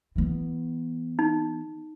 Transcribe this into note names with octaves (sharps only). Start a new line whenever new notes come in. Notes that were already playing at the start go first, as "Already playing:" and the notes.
E3 B3
D#4